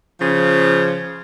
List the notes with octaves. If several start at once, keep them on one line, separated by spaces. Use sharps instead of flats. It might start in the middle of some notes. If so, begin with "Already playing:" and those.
C#3 F3